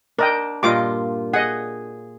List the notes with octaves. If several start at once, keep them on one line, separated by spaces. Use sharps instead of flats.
D4 A#4 D#5 G5
G2 A#2 F4 D#5 D6
G#4 D#5 F#5